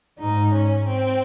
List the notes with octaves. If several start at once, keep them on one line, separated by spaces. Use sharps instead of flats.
G#2 D#4
C#4
C4